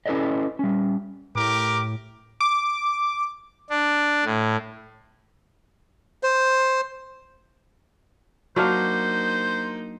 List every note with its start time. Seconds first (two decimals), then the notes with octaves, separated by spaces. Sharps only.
0.06 C#4 E4 A4 B4 D5 D#5
0.59 G3 C#4
1.35 A2 G4 A#4 D6
2.41 D6
3.70 D4
4.25 A2
6.23 C5
8.56 F#3 A#3 D4 D#4 C5 F5